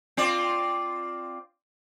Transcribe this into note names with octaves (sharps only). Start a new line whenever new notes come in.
C4 F4 D5